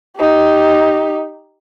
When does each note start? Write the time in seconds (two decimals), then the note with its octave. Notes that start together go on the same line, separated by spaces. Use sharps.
0.17 D#4 G4